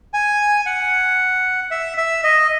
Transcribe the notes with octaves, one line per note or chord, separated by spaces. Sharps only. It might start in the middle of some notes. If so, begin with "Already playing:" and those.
G#5
F#5
E5
E5
D#5